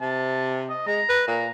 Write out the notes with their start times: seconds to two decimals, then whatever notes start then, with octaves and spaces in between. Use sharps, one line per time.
0.01 C3 A5
0.69 D#5
0.87 G#3 A#5
1.10 B4
1.28 A#2 A#5